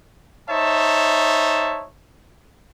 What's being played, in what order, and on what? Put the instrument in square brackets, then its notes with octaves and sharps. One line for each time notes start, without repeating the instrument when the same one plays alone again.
[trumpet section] D#4 C5 C#5 E5 A5